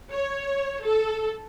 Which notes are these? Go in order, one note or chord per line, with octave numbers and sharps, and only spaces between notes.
C#5
A4